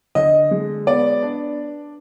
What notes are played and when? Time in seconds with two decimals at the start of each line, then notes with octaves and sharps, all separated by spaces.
0.15 D3 D#5
0.51 G#3
0.87 B3 D5
1.23 D4